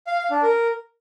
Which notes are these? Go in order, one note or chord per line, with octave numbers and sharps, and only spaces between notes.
F5
F5
D4
A#4